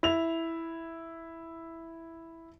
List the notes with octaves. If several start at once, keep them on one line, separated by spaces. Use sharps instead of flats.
E4 F7